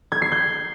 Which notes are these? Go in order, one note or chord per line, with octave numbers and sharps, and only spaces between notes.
G#6
C7
G6